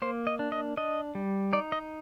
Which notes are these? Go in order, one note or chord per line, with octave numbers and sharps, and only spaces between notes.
A#3 C5
D#5
D4
D#5
D4 D#5
G3
D#4 D5
D#5